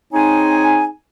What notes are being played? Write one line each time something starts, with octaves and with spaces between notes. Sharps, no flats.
C4 D#4 G#4 C#5 G#5